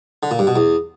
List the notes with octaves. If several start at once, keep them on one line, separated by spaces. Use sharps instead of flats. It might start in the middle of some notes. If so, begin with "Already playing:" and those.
D3
A#2
G2
B2
E2